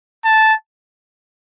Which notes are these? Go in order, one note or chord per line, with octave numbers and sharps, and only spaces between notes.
A5